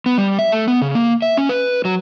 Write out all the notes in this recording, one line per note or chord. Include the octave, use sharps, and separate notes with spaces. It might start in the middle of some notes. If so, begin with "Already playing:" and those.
B3
G3
E5
A3
B3
C#3
A#3
E5
C#4
B4
F#3